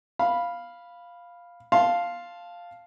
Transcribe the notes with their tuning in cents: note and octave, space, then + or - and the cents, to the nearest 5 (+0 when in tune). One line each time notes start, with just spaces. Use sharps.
F5 +0 B5 -5
F5 +0 A5 +0 C6 +0